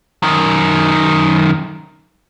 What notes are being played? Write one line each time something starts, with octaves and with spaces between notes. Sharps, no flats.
F#2 D#3